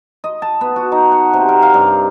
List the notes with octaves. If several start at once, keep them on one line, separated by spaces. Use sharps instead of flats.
D#5
A5
B3
F#4
D#4
F#5
C3
A#4
F5
G2